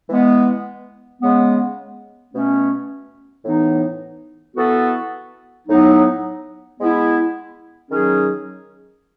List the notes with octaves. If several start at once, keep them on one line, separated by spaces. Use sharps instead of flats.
E3 G#3 B3
C#3 G#3 B3
B2 A3 C#4
A2 E3 B3 D#4
E3 B3 F#4 A4
A2 F#3 B3 D#4
G#3 B3 E4
D#3 F#3 C#4 G#4